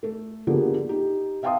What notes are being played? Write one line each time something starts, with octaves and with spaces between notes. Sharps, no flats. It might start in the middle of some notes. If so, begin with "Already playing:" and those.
A3 A4
D3 F3 A#3 B3 G4 G#4
D#4 G4
E5 F5 G5 A5 C6 D#6